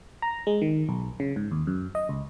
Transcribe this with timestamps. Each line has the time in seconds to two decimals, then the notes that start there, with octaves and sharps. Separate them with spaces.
0.22 A#5
0.47 G#3
0.62 D#3
0.89 B1
1.20 C#3
1.36 G#2
1.51 D#2
1.67 F#2
1.95 D#5
2.09 C#2